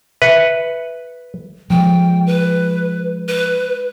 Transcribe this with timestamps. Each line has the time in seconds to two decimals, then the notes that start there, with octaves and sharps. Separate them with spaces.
0.22 B4 E5 C#7
1.70 F3 G#3 G5
2.27 B4
3.28 B4